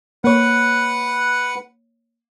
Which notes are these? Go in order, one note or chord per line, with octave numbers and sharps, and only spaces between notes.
A#3 B4 C#5 F#5